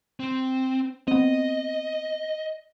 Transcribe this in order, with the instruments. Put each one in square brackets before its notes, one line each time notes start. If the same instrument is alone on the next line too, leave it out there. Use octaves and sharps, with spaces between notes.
[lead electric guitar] C4
[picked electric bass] B3 C4 [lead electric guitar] D#5